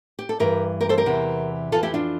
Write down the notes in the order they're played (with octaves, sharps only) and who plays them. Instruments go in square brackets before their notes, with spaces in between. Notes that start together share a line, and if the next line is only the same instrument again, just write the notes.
[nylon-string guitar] G4
A4
G2 E3 G4 A#4
G4 A#4
A4 C5
G4 A#4
E2 C3 E3
F2 E3 F4 A4
E4 G4
D4 F4